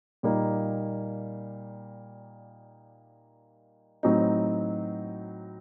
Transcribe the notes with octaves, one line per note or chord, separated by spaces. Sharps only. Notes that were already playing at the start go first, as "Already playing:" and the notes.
A#2 G3 A#3 D#4
A2 F#3 C4 D#4